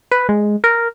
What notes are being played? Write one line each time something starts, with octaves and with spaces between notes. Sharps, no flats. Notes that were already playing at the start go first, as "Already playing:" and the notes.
B4
G#3
A#4